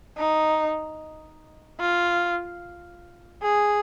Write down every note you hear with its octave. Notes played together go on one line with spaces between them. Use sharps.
D#4
F4
G#4